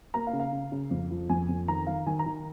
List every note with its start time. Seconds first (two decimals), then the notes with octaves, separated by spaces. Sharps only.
0.14 A#3 A#5
0.27 F5
0.33 C#3
0.40 F5
0.53 C#3
0.72 C#3
0.91 F2
1.11 F3
1.29 F2 G#5
1.49 F2
1.68 D#3 A#5
1.87 D#3 F5
2.06 D#3 G#5
2.19 A#5
2.26 D#3